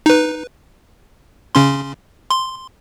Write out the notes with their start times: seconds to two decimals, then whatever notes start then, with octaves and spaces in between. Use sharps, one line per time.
0.06 D#4 B4
1.55 C#3 C#4 C6
2.30 C6